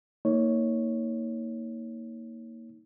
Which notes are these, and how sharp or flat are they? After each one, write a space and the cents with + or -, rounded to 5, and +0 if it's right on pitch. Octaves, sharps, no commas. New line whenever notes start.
A#3 -15 D#4 +30 C#5 +0